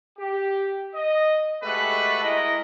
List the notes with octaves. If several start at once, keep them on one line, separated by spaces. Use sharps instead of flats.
G4
D#5
G#3 A3 F#4 G4 A4 B4
G#3 E4 A#4 D#5